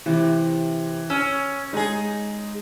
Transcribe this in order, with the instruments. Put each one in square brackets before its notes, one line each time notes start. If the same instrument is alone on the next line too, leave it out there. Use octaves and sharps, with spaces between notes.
[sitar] C3 [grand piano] E3
[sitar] C#4 [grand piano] E6
[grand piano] G#3 [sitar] D#4 G#4